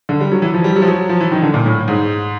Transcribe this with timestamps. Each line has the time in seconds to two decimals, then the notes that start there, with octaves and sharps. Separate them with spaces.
0.09 D3
0.20 G3
0.32 F#3
0.42 E3
0.54 F3
0.64 G3
0.76 F#3
0.82 F3
0.88 F#3
1.09 F3
1.20 E3
1.32 D#3
1.42 D3
1.54 A#2
1.66 A2
1.88 G#2